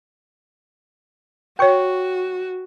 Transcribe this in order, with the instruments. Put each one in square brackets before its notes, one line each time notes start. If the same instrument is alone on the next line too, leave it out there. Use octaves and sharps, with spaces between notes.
[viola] F#4 [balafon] B4 C#5 [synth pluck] G5 C#6